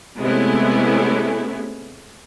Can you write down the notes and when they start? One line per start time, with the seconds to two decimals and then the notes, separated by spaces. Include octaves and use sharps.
0.21 C3 G#3 A3 B3 C#4 E4